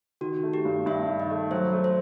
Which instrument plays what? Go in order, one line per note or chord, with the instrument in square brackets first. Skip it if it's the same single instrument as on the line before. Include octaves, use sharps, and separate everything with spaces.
[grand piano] D#3 [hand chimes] F#4
[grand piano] A3
[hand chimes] G4
[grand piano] G2
[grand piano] G2 [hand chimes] E5
[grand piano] D#3
[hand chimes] D#5
[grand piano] A3
[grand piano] F#3 [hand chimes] C5
[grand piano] A3
[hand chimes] C5